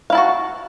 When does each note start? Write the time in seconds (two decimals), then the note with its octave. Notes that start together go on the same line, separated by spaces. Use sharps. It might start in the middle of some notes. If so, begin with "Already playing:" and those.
0.10 F5
0.12 E4
0.15 A5
0.17 F#4